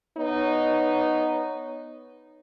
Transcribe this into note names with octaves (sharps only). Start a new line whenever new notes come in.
B3 D#4 C#5